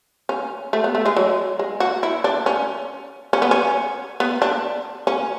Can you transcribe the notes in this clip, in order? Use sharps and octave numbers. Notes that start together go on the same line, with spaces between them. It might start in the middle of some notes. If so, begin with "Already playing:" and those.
C#4
A3
B3
A3
G#3
F#3
G#3
F#4
E4
D4
C#4
C#4
B3
C#4
B3
D4
C#4